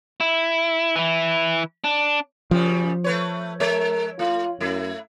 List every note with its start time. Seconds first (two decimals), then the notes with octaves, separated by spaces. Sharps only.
0.20 E4
0.96 E3 E4
1.84 D4
2.51 F#2 C#3 F3 G3
3.04 A3 B4 C#5
3.60 G#3 A#4 C#5 E5
4.19 A3 F4
4.60 F#2 A3 E4